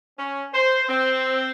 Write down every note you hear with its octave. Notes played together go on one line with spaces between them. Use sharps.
C#4
C5
C4